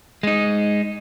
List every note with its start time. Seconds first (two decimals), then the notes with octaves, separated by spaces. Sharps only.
0.23 G#3 D#4